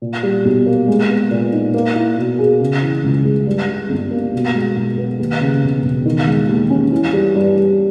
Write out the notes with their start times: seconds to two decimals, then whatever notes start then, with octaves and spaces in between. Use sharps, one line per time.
0.02 A#2
0.23 G3
0.45 B1
0.66 A#3
0.88 G#3
1.09 B3
1.31 A#2
1.53 D#4
1.74 A#3
1.96 E4
2.18 B2
2.39 G#4
2.61 C#3
2.82 E3
3.04 C#2
3.25 G#3
3.47 G2
3.68 G3
3.90 G1
4.11 A#3
4.33 B2
4.55 G#3
4.76 B1
4.98 B3
5.19 D#2
5.41 C#3
5.63 E1
5.84 E1
6.06 D#3
6.27 G#3
6.49 D#2
6.70 C#4
6.92 E3
7.13 G3
7.35 G2
7.56 G2